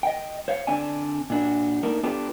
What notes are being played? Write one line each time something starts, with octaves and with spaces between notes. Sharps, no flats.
D#5 G5
C5 C#5 F5
D3 C4 D4 D5 G#5
A#2 D4 F#4
A3 A#3 D4 D#4 A#4
B3 D4 F4 G4 A4 B4